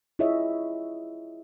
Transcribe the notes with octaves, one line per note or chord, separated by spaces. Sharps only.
E4 F4 G#4 C#5 D#5 E5